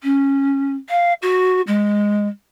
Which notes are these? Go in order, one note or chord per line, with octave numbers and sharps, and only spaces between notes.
C#4
F5
F#4
G#3